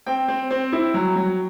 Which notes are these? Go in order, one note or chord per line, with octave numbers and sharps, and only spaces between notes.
C4 G5
C4
C4
E4
F#3
F#3